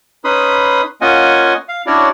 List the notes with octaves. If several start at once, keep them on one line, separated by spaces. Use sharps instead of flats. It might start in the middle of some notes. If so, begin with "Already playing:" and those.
C#4 D#4 B4 B5 C6 D#6
A#3 C#4 F4 D#5 F#5 G#5
F5
C#4 D4 E4 F#4 C#5 D5